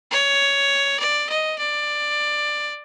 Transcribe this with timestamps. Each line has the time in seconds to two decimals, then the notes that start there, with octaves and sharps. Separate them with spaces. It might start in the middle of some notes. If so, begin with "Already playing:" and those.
0.12 C#5
1.00 D5
1.29 D#5
1.59 D5